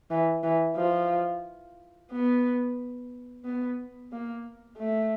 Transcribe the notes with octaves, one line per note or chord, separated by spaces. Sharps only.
E3
E3
F3
B3
B3
A#3
A3